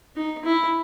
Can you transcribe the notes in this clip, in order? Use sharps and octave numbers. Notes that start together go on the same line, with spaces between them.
D#4
E4